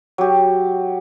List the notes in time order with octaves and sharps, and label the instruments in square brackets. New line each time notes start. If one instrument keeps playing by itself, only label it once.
[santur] F#3 G4